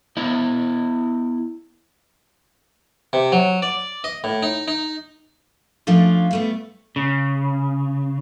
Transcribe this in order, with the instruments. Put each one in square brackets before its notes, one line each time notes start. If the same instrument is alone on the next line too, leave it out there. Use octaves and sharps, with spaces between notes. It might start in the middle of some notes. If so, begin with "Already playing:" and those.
[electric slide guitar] B3 E4 D#5
[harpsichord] C3
F#3
D5
D#5
A2
D#4
D#4
[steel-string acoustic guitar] F3 A3 C#4 D4 F4
G3 A3 B3
[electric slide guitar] C#3